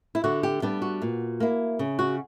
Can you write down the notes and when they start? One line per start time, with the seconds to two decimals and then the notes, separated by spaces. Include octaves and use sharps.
0.15 E4
0.24 D3 F#4
0.43 G4
0.62 G3 B3 D4 G4
0.82 F#4
1.02 A#2
1.40 A#3 E4
1.79 C#3
1.99 F#4